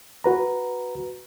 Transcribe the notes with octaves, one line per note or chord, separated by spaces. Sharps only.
F#4 B4 A#5